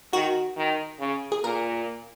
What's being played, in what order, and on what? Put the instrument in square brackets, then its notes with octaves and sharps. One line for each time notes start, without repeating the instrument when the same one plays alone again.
[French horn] D#3 [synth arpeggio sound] F#4
[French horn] D#3
C#3
[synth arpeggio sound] G#4
[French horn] A#2 [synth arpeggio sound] A#4